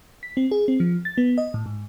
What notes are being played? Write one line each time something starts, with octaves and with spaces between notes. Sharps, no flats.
B6
C4
G#4
C4
F3
A6
B3
D#5
A2
G#2